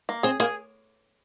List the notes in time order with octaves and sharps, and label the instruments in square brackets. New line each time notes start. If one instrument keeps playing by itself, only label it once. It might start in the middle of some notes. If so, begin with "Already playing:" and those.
[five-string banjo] A#3
[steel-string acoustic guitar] C4 [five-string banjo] G#4
[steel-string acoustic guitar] A#3 [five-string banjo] G#4